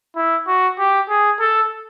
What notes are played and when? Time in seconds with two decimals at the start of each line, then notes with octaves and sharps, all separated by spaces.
0.16 E4
0.47 F#4
0.79 G4
1.09 G#4
1.40 A4